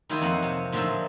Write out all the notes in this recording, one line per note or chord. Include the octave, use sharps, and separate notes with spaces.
D#3 F#3 E4 F4 G4 D#5
F2 F#3 A#3 D#5 F#5
C3
A#2 D3 F3 F#3 D#4 E5